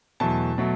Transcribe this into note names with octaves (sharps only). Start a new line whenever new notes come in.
E2 B2 F#3 A3 A5
B2 F#3 A3